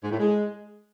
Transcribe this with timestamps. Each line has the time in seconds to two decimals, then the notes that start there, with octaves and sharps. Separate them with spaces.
0.03 G#2
0.10 A2
0.18 G#3